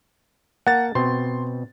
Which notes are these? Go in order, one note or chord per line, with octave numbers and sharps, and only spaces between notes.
A#3 F#5 A5 A#5 A6
B2 C4 C6